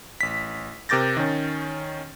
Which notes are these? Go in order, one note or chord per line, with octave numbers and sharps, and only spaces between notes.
A1 B6
C3 A#4 D6 G6 A6 A#6
D#3 C#4